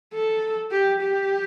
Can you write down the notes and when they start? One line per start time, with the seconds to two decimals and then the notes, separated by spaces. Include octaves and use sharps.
0.14 A4
0.72 G4
1.01 G4